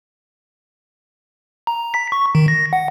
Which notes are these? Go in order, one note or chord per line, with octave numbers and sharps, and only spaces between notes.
A#5
B6
C#6
D#3
A#6
F#5